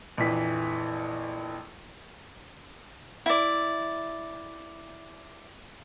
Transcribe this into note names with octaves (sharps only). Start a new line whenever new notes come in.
A#1 F2 E3 B6
E4 D5